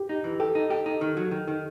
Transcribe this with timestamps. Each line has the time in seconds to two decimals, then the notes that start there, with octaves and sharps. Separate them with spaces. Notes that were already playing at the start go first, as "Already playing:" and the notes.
Already playing: G4
0.09 D#4
0.24 E3
0.40 G4 A4
0.55 D#4
0.70 G4
0.86 D#4
1.01 D#3
1.17 F#3
1.31 D#3
1.48 D#3